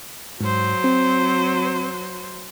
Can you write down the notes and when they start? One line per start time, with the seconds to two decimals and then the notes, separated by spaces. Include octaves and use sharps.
0.41 G#2 F#3 C5
0.84 C4